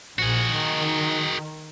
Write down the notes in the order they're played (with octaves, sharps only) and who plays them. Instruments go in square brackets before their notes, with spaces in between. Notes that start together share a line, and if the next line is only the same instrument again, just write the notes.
[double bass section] A#1 [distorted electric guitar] F#4 G#4
[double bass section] D#3